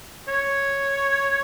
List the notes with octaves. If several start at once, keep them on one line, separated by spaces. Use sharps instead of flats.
C#5